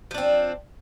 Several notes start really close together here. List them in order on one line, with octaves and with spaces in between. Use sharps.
F3 D4 C4